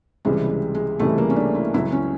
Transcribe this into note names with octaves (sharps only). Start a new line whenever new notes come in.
C#2 C3 E3 G3 G#3
G#3
G#3
C#2 C3 E3 G3 A3
A#3
C#4
D4
E4
C#2 C#3 F#3 E4
C#4